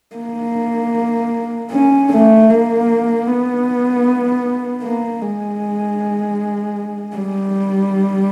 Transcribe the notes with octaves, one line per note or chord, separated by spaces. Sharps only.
A#3
C#4
A3
A#3
B3
A#3
G#3
G3